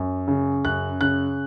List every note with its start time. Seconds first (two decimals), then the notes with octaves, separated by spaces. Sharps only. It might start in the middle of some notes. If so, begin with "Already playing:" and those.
Already playing: F#2
0.28 C#3
0.65 F#2 F#6
1.01 C#3 F#6